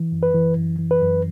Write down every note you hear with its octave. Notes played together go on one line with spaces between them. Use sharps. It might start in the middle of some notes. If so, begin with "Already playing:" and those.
Already playing: E3
F#2
B4
E3
F#2
E3
B4
F#2